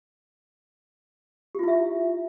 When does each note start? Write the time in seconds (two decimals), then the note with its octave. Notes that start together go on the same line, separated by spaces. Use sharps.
1.55 G4
1.59 F4
1.63 E4
1.68 E5